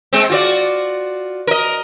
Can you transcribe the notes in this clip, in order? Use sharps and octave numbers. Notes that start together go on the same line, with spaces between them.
G#3 C4
F4 F#4 D5
A#4 D#5